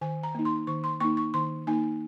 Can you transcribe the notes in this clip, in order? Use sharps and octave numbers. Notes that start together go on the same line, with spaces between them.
D#3 G#5
A#5
A#3 D#4
C6
D#3 C#6
C6
A#3 D#4 C#6
C#6
D#3 C6
A#3 D#4 G#5